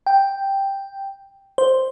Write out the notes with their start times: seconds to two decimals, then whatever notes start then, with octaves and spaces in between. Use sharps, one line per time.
0.06 G5
1.58 C5